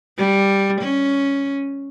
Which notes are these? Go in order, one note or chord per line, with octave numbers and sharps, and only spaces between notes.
G3
C#4